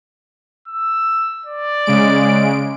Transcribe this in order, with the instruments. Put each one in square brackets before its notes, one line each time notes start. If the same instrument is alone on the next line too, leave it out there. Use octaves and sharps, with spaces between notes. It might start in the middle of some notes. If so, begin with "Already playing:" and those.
[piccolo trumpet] E6
D5
[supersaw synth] C#3 G#3 D7